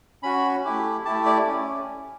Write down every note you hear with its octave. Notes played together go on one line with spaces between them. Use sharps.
C#4 F#4 B5
A3 E4 G4
A3 E4 G4 A5
D5
C#4